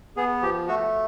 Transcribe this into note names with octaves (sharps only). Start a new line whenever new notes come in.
B3 G#4
F3 G4
A3 F#4